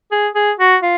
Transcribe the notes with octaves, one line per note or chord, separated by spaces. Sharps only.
G#4
G#4
F#4
F4